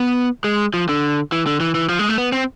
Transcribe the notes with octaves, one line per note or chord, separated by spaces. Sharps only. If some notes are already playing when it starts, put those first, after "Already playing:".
Already playing: B3
G#3
F3
D3
E3
D3
E3
E3
F3
G#3
A3
B3
C4